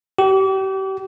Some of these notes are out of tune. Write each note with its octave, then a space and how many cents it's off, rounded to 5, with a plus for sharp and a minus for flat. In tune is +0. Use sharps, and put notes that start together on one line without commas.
G4 -35